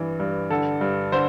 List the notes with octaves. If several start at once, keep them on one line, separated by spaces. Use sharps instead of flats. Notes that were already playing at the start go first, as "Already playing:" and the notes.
Already playing: G2 E3
G2
D3 A4
G2
D3 C5